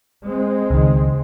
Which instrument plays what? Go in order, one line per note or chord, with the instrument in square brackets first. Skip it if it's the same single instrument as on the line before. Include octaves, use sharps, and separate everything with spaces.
[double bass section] G#3 C4
[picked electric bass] C#2 D#3